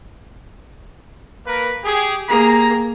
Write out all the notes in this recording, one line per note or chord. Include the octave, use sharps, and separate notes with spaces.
A#3 A#4 B4
G4 G#4
A#3 G4 G#4 A#5